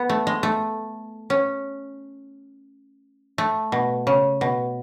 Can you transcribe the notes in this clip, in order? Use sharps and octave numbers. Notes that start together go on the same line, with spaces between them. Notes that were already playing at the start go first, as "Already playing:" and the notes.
Already playing: B3
A3
G#3
A3
C#4
A3
B2
C#3
B2